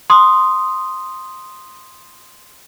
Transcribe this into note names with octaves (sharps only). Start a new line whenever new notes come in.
C6 D#6